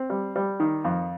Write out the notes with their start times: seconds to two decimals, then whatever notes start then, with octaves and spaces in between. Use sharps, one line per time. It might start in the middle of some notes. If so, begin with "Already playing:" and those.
Already playing: C4
0.10 G3
0.36 G3
0.60 D#3
0.85 F2